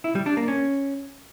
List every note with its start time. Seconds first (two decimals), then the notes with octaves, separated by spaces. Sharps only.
0.04 E4
0.15 G3
0.26 D4
0.37 A#3
0.48 C#4